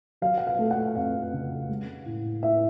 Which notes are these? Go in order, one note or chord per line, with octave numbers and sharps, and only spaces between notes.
F#3 F5
F#5
F5
A3
F#5
F2 F5
C#3
G#3
A2
A2 E5